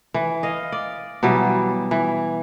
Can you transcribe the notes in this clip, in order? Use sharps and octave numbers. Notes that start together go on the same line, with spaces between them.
E3
D#5 F5
D5
B2 E3 F#3 G3
E3